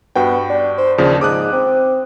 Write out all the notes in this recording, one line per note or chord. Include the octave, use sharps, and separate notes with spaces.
G2 B3 F#4 G5
D4
C5
D#2 C#3 F3 D4
G#2 D6 D#6 F#6
C4